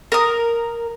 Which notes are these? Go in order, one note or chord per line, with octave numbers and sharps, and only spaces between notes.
A#4 D#6